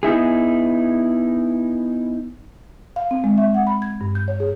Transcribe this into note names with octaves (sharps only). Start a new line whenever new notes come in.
B3 D#4 E4 G#4
F5
C4
G#3
E5
F#5
B5
G#6
G2
G6
C#5
G#4